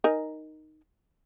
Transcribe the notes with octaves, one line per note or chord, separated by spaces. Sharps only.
D#4 A#4 G#5